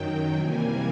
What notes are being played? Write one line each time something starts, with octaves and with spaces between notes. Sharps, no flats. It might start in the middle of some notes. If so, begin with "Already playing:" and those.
Already playing: F#2 D#3 F#3 G5
C3 E3 G3 A#3 G#5